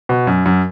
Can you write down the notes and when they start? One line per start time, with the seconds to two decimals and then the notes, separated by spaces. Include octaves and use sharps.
0.09 B2
0.27 F#2
0.46 F#2